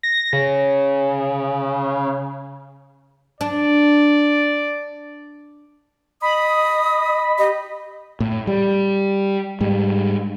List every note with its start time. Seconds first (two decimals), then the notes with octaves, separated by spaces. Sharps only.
0.03 A#6
0.33 C#3
3.41 D4 D5
6.22 D#5 B5 D#6
7.38 G4 D#5
8.20 A2
8.47 G3
9.61 G#2 G3